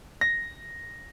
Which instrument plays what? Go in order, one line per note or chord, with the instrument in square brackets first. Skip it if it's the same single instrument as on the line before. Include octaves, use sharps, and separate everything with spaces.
[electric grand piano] A#6